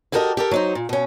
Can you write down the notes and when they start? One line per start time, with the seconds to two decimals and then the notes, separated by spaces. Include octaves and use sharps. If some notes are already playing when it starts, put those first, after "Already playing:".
0.12 E4 F#4 G4 A4 A#4 D#5
0.37 G4 A4 A#4
0.51 F#3 D#4 C5
0.75 A#2
0.89 B2 C#4